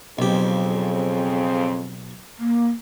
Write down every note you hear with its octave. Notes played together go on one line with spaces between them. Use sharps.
B1 F2 C#3 C4 G4
A#3